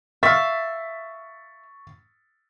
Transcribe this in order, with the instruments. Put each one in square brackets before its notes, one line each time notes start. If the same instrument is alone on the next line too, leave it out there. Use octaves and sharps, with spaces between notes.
[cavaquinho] E5 F5 [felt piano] C#6 A6 B6